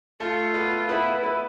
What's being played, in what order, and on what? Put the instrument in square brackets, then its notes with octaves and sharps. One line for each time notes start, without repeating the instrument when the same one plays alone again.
[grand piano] A3 A4 [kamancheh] F4
[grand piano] B3 B4
[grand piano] B3 B4 [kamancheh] E4
[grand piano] B3 B4